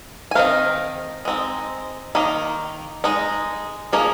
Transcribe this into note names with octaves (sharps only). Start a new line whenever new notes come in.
G#5
D#3 C4 D#4 F5
G#3 C4 D#4
D#3 A#3 D#4
G#3 D#4
F3 A#3 D#4 G#4